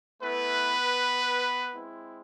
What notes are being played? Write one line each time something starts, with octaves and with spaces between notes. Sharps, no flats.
A3 B3 E4 B4
G#3 C4 E4